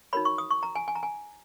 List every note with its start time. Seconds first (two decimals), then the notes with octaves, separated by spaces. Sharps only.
0.13 D#4 F#4 A#4 C#5 B5
0.25 C#6
0.38 D#6
0.51 C#6
0.63 A#5
0.75 G#5
0.88 G#5
0.95 A#5
1.03 G#5